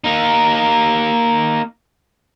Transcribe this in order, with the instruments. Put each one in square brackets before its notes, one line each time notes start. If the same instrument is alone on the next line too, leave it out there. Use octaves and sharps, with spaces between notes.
[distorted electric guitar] A#3 D#4